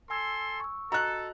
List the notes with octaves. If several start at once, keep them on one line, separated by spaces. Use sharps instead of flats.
A4 G#5 C6 E6 G#6
C#6 E6
F#4 A4 D#5 A#5 F#6